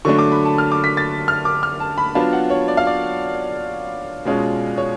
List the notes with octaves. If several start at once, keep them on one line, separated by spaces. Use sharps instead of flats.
D3 F#3 A3 D4 C#6
D6
B5
A5
F6
D6
B6
A6
F6
D6
F6
A5
B5
F#3 B3 D4 F4 A5
F#5
C#5
D5
F5
D5
B2 G#3 C#4 F4
C#5